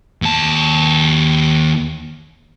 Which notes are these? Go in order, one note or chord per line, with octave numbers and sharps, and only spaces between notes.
D#2 A5